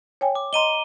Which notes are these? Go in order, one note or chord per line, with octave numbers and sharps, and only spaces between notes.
C#5 G5 G#5
D6
D#5 A#5 C6 D#7 G7